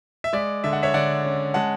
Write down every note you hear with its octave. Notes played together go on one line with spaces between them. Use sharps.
E5
G#3 D5
D3 E5
F#5
C#5 E5
D3 D5 F#5
C#4
G#3 F#5 A5